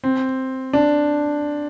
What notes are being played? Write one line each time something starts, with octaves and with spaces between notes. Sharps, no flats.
C4
D4